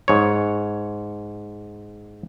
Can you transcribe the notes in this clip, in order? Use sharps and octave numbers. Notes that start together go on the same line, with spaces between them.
G#2 C#5